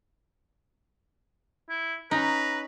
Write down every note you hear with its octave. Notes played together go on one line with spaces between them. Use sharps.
E4
C#4 D#4 B4 A#5